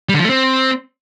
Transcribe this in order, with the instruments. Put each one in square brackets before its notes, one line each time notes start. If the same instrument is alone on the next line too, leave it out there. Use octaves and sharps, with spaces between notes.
[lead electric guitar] G3
D3
F3
A3
C4